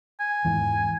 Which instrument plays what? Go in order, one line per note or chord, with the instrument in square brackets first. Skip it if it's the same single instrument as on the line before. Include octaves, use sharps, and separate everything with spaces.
[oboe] G#5
[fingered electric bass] E2 G#2 E3